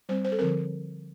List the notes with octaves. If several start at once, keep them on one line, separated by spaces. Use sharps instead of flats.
G3 C4 C5
C5
A4
D3 F3 C4 A#4